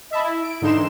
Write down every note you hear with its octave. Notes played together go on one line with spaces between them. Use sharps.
D#5 E5 A5 B5
E4
D7
G#2 D3 E3 D#4 C6 E7